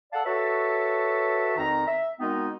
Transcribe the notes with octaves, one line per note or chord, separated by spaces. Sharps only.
A4 D5 F5 F#5 A5
F#4 A4 B4 C#5 E5 A5
F2 D#3 D#4 A#5
E5
G#3 B3 C4 D#4 F#4 A#4